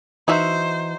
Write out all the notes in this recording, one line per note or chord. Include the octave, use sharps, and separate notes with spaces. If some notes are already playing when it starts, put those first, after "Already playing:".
E3 D#4 F#4 C5 E5